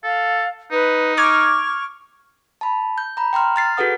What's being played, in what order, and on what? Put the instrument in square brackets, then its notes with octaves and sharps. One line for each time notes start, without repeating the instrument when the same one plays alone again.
[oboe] A4 [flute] F5
[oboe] D#4 [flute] B4
[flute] C#6 [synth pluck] D6 F6 G#6
[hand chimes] A5 B5
G6
A#5 B5
G5 A#5 C6 F6
F6 A6 C7
F#4 G#4 A4 B4 F#5 D#6